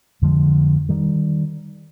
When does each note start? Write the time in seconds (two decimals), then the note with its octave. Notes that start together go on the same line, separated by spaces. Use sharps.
0.22 F2 D3 F3 G#3
0.89 D#3 G3